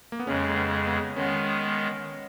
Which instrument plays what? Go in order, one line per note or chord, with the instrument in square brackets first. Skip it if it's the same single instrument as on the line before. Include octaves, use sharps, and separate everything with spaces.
[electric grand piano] A#3
B3
[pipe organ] F2 C#3 G#3 [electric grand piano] C#4
[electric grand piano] B3
B3
[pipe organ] D#3 G#3 B3 [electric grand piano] C#4